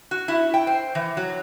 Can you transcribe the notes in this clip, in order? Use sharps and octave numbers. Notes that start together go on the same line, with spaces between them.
F#4
E4
G5
C5
E3
F#3